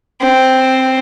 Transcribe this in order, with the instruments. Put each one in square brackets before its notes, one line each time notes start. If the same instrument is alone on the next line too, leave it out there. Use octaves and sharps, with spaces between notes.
[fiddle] C4